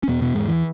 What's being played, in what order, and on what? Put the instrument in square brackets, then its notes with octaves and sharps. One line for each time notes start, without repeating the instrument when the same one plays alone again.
[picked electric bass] C#4
E2 B2 B3
B2 B3
E2 G#2 G#3
E3